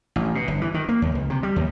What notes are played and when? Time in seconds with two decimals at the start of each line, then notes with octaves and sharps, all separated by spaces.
0.16 A1
0.35 B2
0.48 G1
0.61 E3
0.74 D#3
0.89 A#3
1.02 D#2
1.15 C#2
1.30 C3
1.43 G3
1.56 D#2